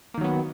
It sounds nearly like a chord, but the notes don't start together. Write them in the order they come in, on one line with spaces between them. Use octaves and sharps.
A#3 D#3 F#3 B3